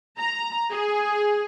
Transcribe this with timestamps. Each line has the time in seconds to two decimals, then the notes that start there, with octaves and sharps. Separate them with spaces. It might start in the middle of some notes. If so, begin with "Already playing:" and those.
0.20 A#5
0.72 G#4